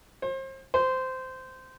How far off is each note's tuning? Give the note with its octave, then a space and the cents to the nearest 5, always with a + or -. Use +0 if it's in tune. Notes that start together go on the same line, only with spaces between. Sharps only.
C5 +35
C5 -15